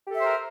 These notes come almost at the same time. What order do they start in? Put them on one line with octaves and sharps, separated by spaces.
G4 A4 E5 C5 A#4